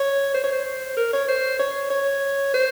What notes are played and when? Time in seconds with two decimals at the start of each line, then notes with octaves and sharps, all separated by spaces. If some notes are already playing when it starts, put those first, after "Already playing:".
Already playing: C#5
0.34 C5
0.44 C#5
0.52 C5
0.97 A#4
1.13 C#5
1.28 C5
1.59 C#5
1.90 C#5
2.54 C5